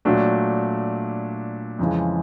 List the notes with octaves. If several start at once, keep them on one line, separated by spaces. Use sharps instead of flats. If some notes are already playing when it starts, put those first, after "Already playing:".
A#2 F#3 A3 D4 F#4
F2 C#3 E3 G#3